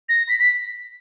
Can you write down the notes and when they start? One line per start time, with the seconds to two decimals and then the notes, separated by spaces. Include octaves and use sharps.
0.09 A#6
0.29 B6
0.40 B6